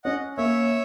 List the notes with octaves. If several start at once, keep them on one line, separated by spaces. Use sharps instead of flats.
C#4 D#5 F#5
A#3 C#5 E5